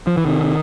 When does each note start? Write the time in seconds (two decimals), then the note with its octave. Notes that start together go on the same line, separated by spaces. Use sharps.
0.07 F3
0.17 E3
0.26 C3 D#3
0.41 C3